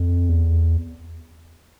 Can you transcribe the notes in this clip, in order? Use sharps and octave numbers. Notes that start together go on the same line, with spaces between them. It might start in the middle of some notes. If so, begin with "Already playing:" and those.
Already playing: F2
E2